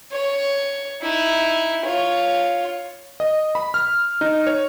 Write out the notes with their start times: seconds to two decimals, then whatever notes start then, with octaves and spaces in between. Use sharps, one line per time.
0.12 C#5
1.02 D#4 E4
1.85 F4 C#5
3.20 D#5
3.55 B5
3.74 F6
4.21 D#4
4.47 C#5